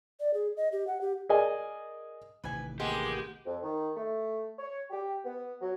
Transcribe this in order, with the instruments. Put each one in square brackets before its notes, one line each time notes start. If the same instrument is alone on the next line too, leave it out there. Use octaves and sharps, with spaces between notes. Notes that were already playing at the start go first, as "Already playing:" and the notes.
[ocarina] D5
G#4
D#5
G4
F#5
G4
[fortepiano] G#4 A#4 D5 D#5 G#5
[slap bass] A1 C3 D#3 [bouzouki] B4 G#5
[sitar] G#3 [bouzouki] A#3 B3 [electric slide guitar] G4
[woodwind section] F2
D#3
A3
C#5
G4
B3
F#3